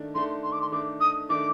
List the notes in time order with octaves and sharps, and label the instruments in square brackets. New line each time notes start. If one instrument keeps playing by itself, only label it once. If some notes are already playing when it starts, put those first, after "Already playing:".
Already playing: [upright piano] D#3 A3 D4
[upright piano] D#3 A3 D4 [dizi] C6
[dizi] C6
D6
C6
[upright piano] D#3 A3 D4 [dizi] D6
[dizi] D#6
[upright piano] D#3 A3 D4 [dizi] D6